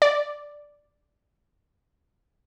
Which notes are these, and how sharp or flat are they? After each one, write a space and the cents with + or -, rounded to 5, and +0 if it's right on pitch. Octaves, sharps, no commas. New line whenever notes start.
D5 +0